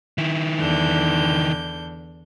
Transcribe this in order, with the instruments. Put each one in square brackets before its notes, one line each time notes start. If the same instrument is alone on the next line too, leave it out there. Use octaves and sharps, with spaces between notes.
[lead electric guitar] D#3 E4
[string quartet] E2 D3 G6